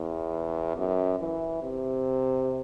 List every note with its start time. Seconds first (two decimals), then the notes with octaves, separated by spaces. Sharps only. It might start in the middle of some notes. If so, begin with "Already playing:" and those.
Already playing: E2
0.77 F#2
1.20 E3
1.62 C3